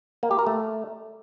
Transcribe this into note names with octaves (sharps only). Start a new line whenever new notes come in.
A#3
G4
A#4
A3